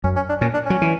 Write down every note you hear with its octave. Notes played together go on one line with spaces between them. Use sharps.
F#2 C#4
C#4
D4
A#2 C#4
D4
F#3 C#4
E3